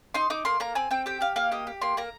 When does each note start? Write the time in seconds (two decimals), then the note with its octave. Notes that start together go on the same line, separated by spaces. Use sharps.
0.14 D#4 C6
0.30 D#4 D6
0.45 A#3 C6
0.60 A#3 A#5
0.75 C4 G#5
0.91 C4 G5
1.06 G4 G5
1.21 G4 F5
1.36 A#3 F5
1.52 G4 D#5
1.67 G4
1.82 A#3 C6
1.97 A#3 A#5